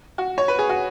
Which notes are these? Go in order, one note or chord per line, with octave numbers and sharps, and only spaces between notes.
F#4
C#5
B4
G#4
F#4